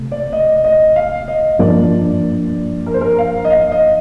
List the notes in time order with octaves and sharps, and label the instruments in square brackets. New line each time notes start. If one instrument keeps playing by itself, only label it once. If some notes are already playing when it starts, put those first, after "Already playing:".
Already playing: [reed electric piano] C3 A3
[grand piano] D5
D#5
D#5
F5
D#5
[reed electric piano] G2 F3 A#3 D4 [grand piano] D5
[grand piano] A#4
C5
A#4
F5
D#5
F5
D#5